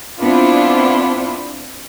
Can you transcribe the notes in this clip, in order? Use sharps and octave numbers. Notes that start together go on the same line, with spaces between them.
B3 C4 D4 E4 F4